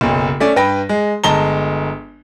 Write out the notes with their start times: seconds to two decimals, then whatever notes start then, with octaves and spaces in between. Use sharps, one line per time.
0.01 F#1 B1
0.40 A3 C#4 D5
0.56 G2 B4 G5 B5 A#6
0.89 G#3
1.24 G1 G#3 D#5 A5 A#5 G7